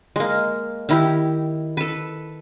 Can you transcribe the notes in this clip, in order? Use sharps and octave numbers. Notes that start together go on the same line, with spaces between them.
G#3 A#3
D#3 E4 G4
A4 B4